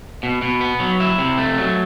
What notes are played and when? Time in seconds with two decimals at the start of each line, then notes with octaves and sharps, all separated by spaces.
0.23 B2
0.42 B2
0.61 B3
0.80 F#3
1.00 E4
1.18 C3
1.38 A3
1.58 F#3